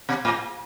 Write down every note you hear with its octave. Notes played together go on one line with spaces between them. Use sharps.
B2
A2